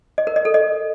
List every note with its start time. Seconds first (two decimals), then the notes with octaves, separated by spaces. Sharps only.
0.18 D#5
0.27 A#4
0.36 D#5
0.45 A4
0.54 D#5